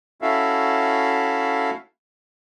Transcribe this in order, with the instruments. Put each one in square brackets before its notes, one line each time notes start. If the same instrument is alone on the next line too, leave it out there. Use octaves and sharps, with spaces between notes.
[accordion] C#4 E4 F#4 A4 E5 F5